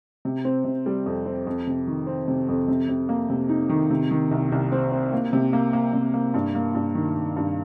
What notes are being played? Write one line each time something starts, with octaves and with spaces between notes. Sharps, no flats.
C3
C4
C3
G3
F2
C4
F2
C3
D#3
C4
C3
F2
C3
C3
A#3
C3
D#4
D#3
C3
D#3
C2
C2
C4
C4
A#3
C3
A#3
A#3
C3
A#3
G2
A#3
G2
D#3
D#3
G2